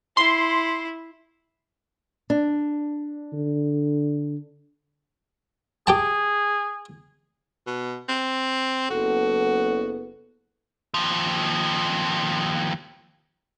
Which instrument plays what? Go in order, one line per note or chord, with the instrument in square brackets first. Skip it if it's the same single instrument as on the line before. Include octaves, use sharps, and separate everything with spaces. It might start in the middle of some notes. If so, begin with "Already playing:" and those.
[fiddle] E4 [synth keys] C6
[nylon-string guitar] D4
[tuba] D3
[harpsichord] G4 G5 A5 [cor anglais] G#4
[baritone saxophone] B2
C4
[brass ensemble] F#1 B3 A4 [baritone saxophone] F#4
[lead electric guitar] D#2 F3